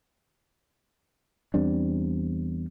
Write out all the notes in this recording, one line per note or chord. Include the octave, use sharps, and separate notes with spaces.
E2 G3 C4 D4